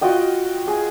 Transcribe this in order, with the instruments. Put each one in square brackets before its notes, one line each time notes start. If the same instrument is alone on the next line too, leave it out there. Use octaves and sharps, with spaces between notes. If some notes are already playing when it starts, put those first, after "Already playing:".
[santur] F4 F#4 D#5 G5
G#4